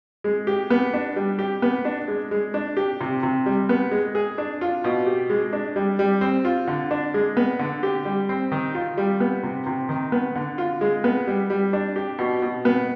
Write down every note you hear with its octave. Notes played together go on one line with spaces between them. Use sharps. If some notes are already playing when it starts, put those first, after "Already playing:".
G#3
G4
B3
D4
G3
G4
B3
D4
G#3
G#3
D4
G4
C3
C3
G3
B3
G#3
G#4
D4
F4
B2
G4
G#3
D4
G3
G3
C4
F4
D3
D4
G#3
B3
D3
G4
G3
C4
D#3
F4
G3
B3
C3
C3
D#3
B3
D3
F4
G#3
B3
G3
G3
D4
G4
B2
B2
B3